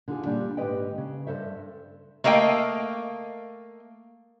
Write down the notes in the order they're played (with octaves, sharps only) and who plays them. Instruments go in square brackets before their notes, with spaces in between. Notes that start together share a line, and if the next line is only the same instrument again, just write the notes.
[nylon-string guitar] D3 D#4 F4 G#4
A#2 G3 D4
G#2 D3 G4 B4 D#5 G5
C#3
G2 A4 C5 E5
[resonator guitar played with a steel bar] A3 A#3 D#5 F5 G5